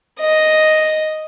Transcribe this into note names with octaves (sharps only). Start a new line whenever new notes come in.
D#5